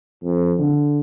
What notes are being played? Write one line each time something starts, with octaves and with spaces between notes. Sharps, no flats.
F2
D3